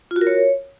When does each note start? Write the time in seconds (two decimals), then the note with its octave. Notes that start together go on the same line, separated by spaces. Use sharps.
0.11 F4
0.16 F#4
0.21 A#4
0.27 C#5